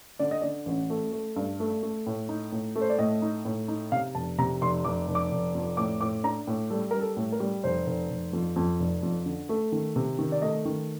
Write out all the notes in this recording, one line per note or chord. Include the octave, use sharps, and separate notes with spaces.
D3 D5
D#5
D3 D5
A1
A3
A3
G2
A3
A3
A2
D#4
A2
A3
C5
D5
A2 D#5
D#4
A2
D#4
C3 F5
F1 A5
C3 A#5
F1 C6
F1 D6
F1
D6
F1
F2
A2 D6
A2 D6
D4 A#5
A2
G3 A4
G3 A#4
A4
A2
A#4
G3
F1 C5
F1
F1
F2
F2
F1
F2
D3
A3
D#3
C3
D#3
D5
A3 D#5
D#3